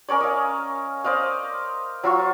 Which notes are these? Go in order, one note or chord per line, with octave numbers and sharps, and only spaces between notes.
C#4 A#4 C#5 D5
D#5 F5
C5 D5 D#5 F5
F#3 F4 C#6